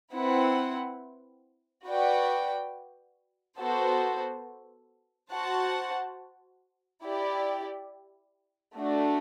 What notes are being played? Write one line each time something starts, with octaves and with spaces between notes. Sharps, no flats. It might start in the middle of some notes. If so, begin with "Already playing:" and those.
C4 E4 B4 F#5
F#4 B4 D5 G5
B3 F#4 A4 C5
F#4 C5 F#5 A5
E4 G4 D5
A3 D4 F#4